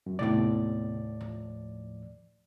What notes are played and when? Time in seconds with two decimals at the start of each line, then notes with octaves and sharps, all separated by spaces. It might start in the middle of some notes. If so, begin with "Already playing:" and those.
0.06 F#2
0.19 D#2 A2 C3 B3 D5
1.21 F3